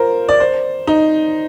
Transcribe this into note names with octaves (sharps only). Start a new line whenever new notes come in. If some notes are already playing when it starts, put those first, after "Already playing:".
Already playing: F4 A#4 C5
D5
C5
D#4